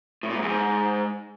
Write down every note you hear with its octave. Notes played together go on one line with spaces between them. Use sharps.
A2
A#2
G#2
E2
G#2